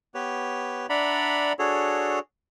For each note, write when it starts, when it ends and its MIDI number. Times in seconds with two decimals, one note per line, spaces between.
0.14 0.86 59
0.14 0.86 67
0.14 0.86 71
0.14 0.86 73
0.90 1.53 62
0.90 1.53 74
0.90 1.53 76
0.90 1.53 78
0.90 1.53 82
0.90 1.53 83
1.59 2.19 62
1.59 2.19 66
1.59 2.19 68
1.59 2.19 69
1.59 2.19 73